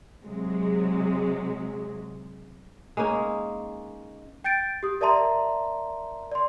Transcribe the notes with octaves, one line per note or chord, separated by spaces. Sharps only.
C3 F#3 G#3
G#3 A#3 C#4 D#4
G5 G6 A6 D7
G4 D#6
A#4 D5 E5 A5 A#5 C6
D5 C6